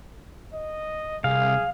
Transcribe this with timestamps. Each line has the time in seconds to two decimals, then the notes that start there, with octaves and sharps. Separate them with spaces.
0.54 D#5
1.24 C2 G#4 F5